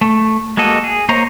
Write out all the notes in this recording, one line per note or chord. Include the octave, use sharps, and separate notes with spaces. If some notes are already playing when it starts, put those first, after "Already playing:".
A3
G#3 A#3 F#4 A4 D#5
G#4
A#3 C5 C#5 D#5 A#5